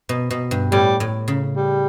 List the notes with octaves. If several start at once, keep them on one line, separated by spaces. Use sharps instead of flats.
B2
B2
G2
A2 G3
A2
C#3
G3